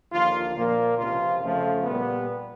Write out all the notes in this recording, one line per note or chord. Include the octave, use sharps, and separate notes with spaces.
D#2 D3 F3 A#3 F4
A#2 F3 A#3
C#2 C3 F3 F4
F2 C#3 F3 A3
A#2 G3 B3